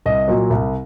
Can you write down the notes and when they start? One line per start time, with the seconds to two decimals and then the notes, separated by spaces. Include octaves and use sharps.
0.06 C2 D#5
0.28 A#2 F#3
0.50 C2